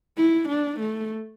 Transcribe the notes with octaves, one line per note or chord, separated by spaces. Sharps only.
E4
D4
A3